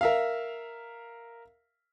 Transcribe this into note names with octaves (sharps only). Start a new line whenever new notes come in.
A#4 E5 F5